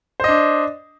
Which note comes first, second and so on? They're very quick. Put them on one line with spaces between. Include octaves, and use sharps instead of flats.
C5 D#5 D4